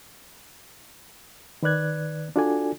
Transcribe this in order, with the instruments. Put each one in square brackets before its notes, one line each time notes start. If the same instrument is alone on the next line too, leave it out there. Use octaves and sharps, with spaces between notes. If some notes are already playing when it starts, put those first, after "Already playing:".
[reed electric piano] D#3 B4 D5 F#6 G#6
D4 F4 F#4 A4 D5 G#5